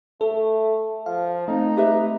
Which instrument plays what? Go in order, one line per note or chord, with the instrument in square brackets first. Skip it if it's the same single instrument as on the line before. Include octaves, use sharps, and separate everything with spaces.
[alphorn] A3 [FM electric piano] A4
[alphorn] F3 [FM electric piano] F5
[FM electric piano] A3 C4 [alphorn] D#4
[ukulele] G4 B4 E5